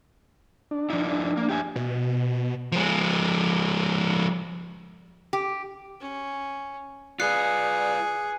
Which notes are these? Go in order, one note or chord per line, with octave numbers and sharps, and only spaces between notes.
D4
F3 D#4 E4
A#3
G4 E5 G#5
B2
F3 G#3
G4
C#4
F4 G#4 B4 D5 F#6 C7 C#7